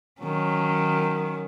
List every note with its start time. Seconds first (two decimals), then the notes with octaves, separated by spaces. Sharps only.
0.22 D#3 F#3 C#4